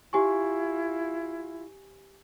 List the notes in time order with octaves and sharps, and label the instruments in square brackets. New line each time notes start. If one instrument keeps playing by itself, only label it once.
[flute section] E4 F4 [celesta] G4 G#5 C#6